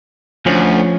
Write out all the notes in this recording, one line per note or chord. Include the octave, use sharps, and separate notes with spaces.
D2 F3 C#4